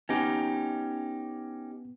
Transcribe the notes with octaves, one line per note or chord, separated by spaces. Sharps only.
B3 C#4 D#4 G4